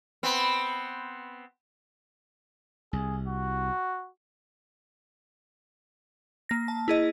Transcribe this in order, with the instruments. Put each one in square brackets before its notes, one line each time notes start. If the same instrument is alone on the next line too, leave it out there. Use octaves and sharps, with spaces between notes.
[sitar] B3 C4
[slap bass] C2 [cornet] G#4
[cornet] F#4
[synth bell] A#3 A#6
A5
E4 G#4 D#5